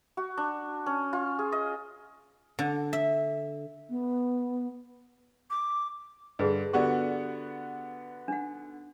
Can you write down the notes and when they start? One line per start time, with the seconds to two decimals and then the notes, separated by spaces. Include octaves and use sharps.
0.17 F#4
0.38 D4
0.86 C#4
1.13 F4
1.39 G#4
1.52 D#5
2.59 D3
2.93 E5
3.90 B3
5.50 D6
6.39 G2 D3 G#4 B4 D#5
6.73 D3 B3 F#4 G4 D5
8.28 D4 D#4 F#5